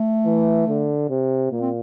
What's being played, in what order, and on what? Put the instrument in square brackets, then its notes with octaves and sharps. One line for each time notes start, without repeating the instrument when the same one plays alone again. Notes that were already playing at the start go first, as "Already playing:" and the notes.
Already playing: [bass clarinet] A3
[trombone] E3
D3
C3
[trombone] A#2 [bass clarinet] A#3
[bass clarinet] C4